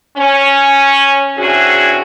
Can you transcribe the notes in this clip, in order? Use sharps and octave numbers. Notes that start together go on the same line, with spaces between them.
C#4
C3 E3 C#4 D4 F#4 G#4